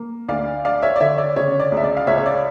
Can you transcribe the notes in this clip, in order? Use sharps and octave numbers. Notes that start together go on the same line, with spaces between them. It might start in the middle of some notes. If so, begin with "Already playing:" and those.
Already playing: A#3
D2 D5 F5
D4 D5 F5
C#5 E5
D5
D3 C#5 E5
D5
C#3 C#5
D5
C#2
E5
D5
F5
C#2 C#5 E5
C#5
D5